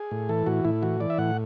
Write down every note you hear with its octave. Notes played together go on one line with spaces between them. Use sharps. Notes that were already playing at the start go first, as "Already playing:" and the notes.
Already playing: G#4
A2
E3 A4
A2 F#4
A2 E4
E3 F#4
E3 D5
E5
A2 F#5